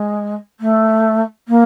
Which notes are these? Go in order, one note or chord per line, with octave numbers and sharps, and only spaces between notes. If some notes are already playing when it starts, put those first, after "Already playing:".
Already playing: G#3
A3
A#3